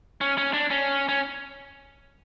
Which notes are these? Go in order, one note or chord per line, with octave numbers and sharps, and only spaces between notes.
C#4
C#4
D4
C#4
C#4